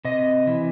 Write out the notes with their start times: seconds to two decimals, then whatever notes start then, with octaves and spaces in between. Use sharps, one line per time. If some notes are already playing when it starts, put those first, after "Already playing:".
0.05 C3 D#5
0.47 E3